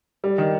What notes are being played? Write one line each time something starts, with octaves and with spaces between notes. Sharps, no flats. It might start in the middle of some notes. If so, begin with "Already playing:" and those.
G3
D#3